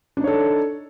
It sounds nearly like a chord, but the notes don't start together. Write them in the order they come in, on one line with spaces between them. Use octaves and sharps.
D4 D#4 C#5 A4